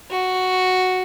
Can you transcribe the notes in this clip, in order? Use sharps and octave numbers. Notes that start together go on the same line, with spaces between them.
F#4